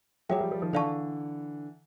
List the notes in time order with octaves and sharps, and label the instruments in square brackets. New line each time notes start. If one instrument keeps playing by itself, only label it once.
[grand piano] F#3 G#3 [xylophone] G#4 C#5 E5 G5
[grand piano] F3 G3
F3 G3
D#3 F3
[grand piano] D3 E3 [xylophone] A4 D5 F5 A5 C#6